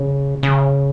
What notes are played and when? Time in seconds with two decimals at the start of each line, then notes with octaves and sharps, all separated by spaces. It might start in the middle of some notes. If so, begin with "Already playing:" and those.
Already playing: C#3
0.43 C#3